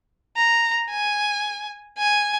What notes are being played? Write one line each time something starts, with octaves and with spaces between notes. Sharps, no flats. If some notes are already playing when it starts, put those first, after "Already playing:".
A#5
G#5
G#5